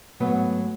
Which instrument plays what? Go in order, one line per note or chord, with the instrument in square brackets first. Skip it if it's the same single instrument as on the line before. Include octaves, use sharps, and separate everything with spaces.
[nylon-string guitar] G#2 F#3 A3 B3